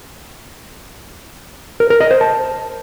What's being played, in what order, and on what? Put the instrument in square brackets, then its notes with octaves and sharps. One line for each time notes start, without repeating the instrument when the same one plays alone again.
[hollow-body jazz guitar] A#4
A#4
D#5
C5
A5